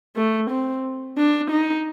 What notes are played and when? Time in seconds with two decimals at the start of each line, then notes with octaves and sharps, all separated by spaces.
0.16 A3
0.50 C4
1.18 D4
1.51 D#4